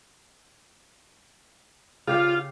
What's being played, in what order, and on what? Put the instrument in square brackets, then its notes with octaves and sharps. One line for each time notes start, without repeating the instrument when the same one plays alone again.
[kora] C#3 G4 F5 [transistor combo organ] F4